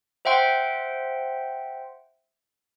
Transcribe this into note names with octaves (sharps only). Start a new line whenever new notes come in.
C5 E5 F#5 G5 C6